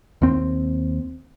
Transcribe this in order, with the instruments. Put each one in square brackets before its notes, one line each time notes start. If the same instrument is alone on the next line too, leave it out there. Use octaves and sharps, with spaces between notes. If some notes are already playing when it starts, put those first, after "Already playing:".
[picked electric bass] D#2 C4